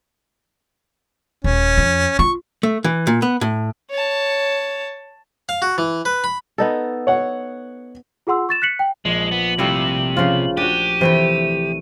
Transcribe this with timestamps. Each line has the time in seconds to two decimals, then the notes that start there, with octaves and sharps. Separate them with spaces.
1.44 D#1 C#4
1.77 F2
2.19 F4 C#6
2.63 A3
2.84 E3
3.07 A#2
3.22 B3
3.41 A2
3.90 C#5 A5
5.49 F5
5.62 F#4
5.78 E3
6.05 B4
6.24 B5
6.58 B3 D#4 A4
7.07 C#5 F#5
8.27 F4 G#4 F#5 C6 E6
8.49 C#6 A6 E7
8.62 F#6 B6 C#7 F#7
8.79 G5
9.05 A#1 G#3 F#7
9.32 B3
9.58 C3 G3 A3 E4 F5 E6
10.16 C#3 F3 F4
10.57 D4 F#4 G4 D#7
11.01 C3 E3 A3 E4